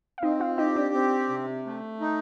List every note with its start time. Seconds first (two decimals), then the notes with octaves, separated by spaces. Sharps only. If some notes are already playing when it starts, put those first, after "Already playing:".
0.18 F5
0.22 C4 D#4 D#5
0.40 F4 F5
0.58 D#4 G4 D#5
0.76 D4 D5
0.95 C4
1.29 C3
1.66 A3
2.01 D#4